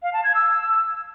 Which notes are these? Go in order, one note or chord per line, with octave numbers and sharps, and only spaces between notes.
F5
A5
G#6
E6